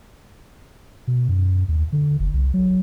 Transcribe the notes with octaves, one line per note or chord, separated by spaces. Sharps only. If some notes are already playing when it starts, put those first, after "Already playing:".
B2
F#2
D#2
D3
F#1
C2
F#3